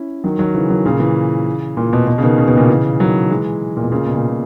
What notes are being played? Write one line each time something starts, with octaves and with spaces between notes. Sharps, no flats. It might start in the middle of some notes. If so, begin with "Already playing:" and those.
Already playing: C#4 E4
D#3 F#3
D#3 F#3
C#3 E3
D#3 F#3
A#2 C#3
C#3 E3
A#2
B2
B2
C#3
B2 D#3
C#3
B2
A#2 C#3
C#3 E3
D#3 F#3
E3 G#3
A#2
B2
A#2 C#3
B2
A#2
A#2